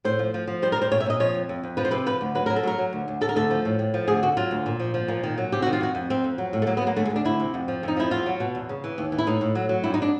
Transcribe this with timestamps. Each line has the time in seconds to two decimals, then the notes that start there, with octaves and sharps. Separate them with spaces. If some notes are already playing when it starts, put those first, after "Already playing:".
0.05 A2 C5
0.19 F3
0.34 F3
0.47 F3
0.62 G3 C5
0.72 A#4
0.76 G3
0.82 C5
0.92 A#2 C#5
1.00 E5
1.06 A#2 D#5
1.20 F3 C#5
1.34 F2
1.49 F2
1.63 F2
1.77 F3 B4
1.85 C5
1.91 C3 B4
2.06 F3 B4
2.21 D2
2.35 F#3 B4
2.46 F#3 A#4
2.56 A4
2.63 F#3 A#4
2.78 F#3
2.93 D2
3.08 D2
3.21 D2 A4
3.29 A#4
3.36 D2 A4
3.51 F3
3.65 A2
3.79 A2
3.94 F3
4.08 D2 G#4
4.23 D3 F#4
4.37 F#3 F4
4.51 D2
4.66 A#2
4.80 F3
4.94 F3
5.08 A#2
5.23 D#3
5.38 F#3
5.52 C3 G4
5.62 D#3 F#4
5.73 F4
5.81 F2 F#4
5.95 F2
6.10 F2 C4
6.24 F2
6.38 F#3
6.53 A2
6.62 A3
6.67 F#3 A#3
6.77 B3
6.82 F#3 A#3
6.96 D2 A3
7.05 G#3
7.10 D2
7.16 D4
7.25 D2 E4
7.40 C3
7.54 F2
7.68 F3
7.83 F2 D#4
7.96 F3 E4
8.11 E2 F4
8.26 F#3
8.40 B2
8.55 E2
8.69 C#3
8.84 E3
8.98 D#2
9.12 E3
9.18 E4
9.27 A2 D#4
9.41 A2
9.55 F#3
9.69 F#3
9.84 G2 E4
9.94 D#4
10.02 D4